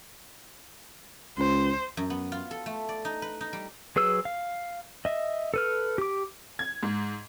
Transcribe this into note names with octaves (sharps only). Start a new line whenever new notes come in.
C#2 C5
F#2
B3
F4
A4
A3
D5
D#4
B4
D#4
G3
F#3 G#4 B4 E6
F5
D#5 E5
A4 B4 F6
G4 D6
G#6
G#2